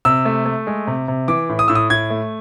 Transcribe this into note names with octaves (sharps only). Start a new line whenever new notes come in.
C3 E6
A3
A3
G#3
C3
C3
E3 D6
A2
D#6
A2 E6
D#6
A2 G#6
A3